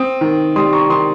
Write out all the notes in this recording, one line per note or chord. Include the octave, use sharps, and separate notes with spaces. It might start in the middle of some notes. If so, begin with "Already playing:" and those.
Already playing: C4 D#6
D#3
G3 C6 D#6
A#5 C#6
D#3 C6 D#6